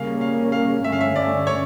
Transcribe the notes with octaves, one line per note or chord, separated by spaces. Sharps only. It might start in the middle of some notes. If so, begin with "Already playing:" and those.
Already playing: C#3 G3 A#3 C#4 F5
F5
F5
G2 D3 A3 C#4 E5
F5
E5
D5
C#5